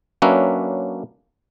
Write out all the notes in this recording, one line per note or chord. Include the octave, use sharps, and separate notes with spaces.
F#3 A#3 C#4 D4 B4 E5